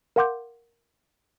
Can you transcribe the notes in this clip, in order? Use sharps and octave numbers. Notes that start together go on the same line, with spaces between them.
A#4 F5 F#5 C6 D6 G6